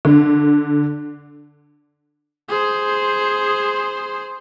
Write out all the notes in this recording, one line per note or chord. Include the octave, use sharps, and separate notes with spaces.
D3
G#4 C5